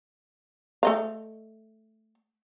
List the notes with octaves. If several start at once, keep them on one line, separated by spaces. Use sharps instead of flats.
A3 D#5 F5